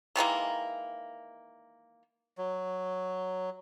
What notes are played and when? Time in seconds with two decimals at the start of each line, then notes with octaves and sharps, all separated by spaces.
0.16 D#3 E3 G#3 A#3
2.38 F#3